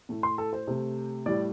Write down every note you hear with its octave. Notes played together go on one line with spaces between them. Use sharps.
A2 A3
C6
A4
C5
C3 A3
A2 G3 D5